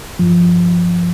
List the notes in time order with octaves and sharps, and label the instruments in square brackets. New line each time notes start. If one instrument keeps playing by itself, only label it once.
[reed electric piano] G2 F3